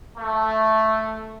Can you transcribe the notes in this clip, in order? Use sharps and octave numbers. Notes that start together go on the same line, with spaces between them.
A3